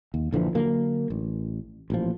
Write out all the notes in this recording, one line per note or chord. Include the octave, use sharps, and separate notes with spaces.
D#2
A#1 D3 E3 F3
D3 F#3 A#3
A1
A1 A#2 F3